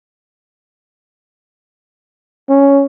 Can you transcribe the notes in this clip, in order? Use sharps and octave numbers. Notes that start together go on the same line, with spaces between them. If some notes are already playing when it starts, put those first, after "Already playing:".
C#4